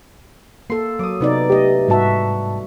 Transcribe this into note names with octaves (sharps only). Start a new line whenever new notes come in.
A#3 A4 C6
F#3 D6 D#6
C3 B3 D#4 D5
A3 G4 D#5
G#2 G3 F#4 E5 A5